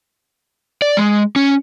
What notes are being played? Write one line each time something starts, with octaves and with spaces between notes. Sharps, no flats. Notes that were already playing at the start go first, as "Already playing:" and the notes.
D5
G#3
C#4